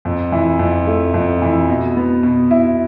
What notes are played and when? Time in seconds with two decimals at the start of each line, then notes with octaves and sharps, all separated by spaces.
0.05 F2
0.32 E3
0.59 F2
0.87 A3
1.14 F2
1.42 E3
1.69 B2
1.97 B3
2.23 B2
2.51 E4